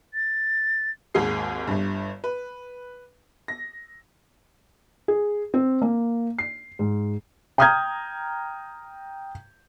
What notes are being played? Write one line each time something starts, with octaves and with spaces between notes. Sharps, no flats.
A6
G#1 D#2 G#2 G#4 C7
G1 G2
B4
A#6
G#4
C4
A#3
C7
G#2
G5 A#5 D#6 F6 G6 G#6